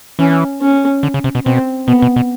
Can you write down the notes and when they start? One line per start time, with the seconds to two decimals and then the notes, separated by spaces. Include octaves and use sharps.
0.19 E3 C#4
0.62 C#4
1.03 D3
1.14 C#3
1.24 C3
1.35 B2
1.46 B2 C4
1.88 B2 B3
2.02 B2
2.16 B2